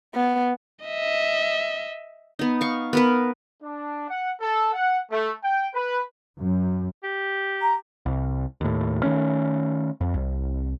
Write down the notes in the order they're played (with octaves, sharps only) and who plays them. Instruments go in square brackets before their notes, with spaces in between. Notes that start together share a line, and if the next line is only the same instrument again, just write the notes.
[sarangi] B3
[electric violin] D#5 E5
[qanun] B3 D#4
F5 C#6
B3 A#4 B4
[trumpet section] D4
F#5
A4
F#5
A3
G5
B4
[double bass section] F#2
[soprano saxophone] G4
[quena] A#5
[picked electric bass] C2
D#2 A2
D#3 F3 A3 C#4
F2
C2